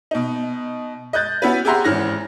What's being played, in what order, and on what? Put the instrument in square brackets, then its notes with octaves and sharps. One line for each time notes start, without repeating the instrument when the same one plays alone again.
[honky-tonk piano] B2 D#4
D#5 F#6 G6 A6
B3 C#4 E4 F#4 B4
G4 G#4 E5 F#5 A#5 C6
G#1 E3 C#4 F6 A#6